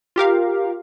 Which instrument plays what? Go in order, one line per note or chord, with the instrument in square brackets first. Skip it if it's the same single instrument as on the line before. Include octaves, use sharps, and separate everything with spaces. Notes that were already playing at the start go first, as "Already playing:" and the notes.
[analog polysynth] F4 G4 A#4 F5